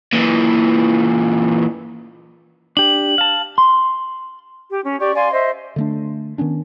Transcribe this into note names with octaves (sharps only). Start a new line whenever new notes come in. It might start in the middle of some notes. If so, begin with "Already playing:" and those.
A#2 E3
D4 G4 F#7
F5 A5
C6
G4
C#4
G4 D5 C#6
D5 F5 G#5 C6
C5 D#5 E5
D3 A3 D4
D#3 B3 C#4 D4